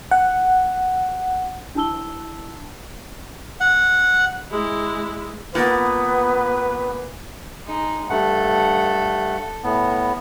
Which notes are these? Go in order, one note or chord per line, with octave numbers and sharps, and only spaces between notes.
F#5
D4 E4 A5 E6 G7
F#5
G#3 E4
A#2 B3 B4
G#3 D#4
G2 A3 A4 F#5
A2 B3